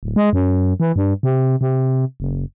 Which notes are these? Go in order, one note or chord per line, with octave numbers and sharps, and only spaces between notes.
D1
G#3
F#2
E3
G2
C3
C3
F#1